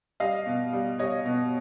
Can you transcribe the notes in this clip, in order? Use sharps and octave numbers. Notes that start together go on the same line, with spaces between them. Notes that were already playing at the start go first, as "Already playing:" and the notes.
G3 D#5 F5
B2
G3
G3 C#5 D#5
B2